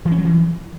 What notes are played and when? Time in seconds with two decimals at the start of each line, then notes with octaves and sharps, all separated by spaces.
0.05 E3
0.12 C#4
0.18 F#3
0.24 E3